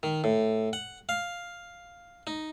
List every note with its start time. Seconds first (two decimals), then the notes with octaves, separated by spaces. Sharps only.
0.03 D#3
0.24 A2
0.73 F#5
1.09 F5
2.27 D#4